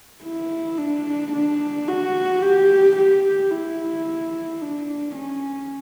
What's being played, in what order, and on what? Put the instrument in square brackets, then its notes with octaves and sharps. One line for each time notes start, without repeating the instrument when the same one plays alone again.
[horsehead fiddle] E4
D4
D4
F#4
G4
G4
E4
D4
C#4